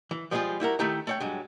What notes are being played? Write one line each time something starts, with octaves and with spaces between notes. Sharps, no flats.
E3
F3 G3 G#3 E4 F4 G#4
G3 E4 F#4 A#4
D#3 A3 E4 G4 A#5
A3 C#5 G5
G2 F#3 G#3